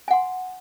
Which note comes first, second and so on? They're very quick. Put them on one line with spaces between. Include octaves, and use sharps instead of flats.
G#5 F#5 C6